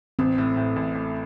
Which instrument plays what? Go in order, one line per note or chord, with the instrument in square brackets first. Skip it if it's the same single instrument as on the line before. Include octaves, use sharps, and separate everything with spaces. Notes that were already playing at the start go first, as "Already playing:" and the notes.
[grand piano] A1 [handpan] C4
[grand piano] A2
A2
A1
A2